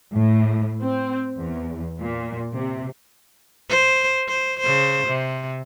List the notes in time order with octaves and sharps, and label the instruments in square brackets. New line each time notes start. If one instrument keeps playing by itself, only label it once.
[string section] A2
C4
E2
A#2
C3
[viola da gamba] C5
C5
C#3 C5
C3